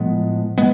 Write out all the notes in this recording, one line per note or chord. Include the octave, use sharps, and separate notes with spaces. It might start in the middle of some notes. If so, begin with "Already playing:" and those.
Already playing: A2 F3 G#3 B3
G#3 B3